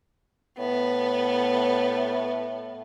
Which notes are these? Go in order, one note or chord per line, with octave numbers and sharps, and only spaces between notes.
A2 B3